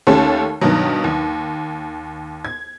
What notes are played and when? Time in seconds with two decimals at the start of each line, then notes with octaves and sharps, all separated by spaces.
0.07 D#2 A3 C#4 G4 C#5 A5
0.61 G2 B2 D#3 F#3
1.04 D#2
2.45 G#6